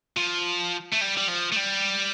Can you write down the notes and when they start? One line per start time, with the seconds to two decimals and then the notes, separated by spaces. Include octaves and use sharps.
0.17 F3
0.92 A3
1.01 G3
1.17 G3
1.28 F3
1.52 A3
1.56 G3